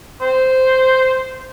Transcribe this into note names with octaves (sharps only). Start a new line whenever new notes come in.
C5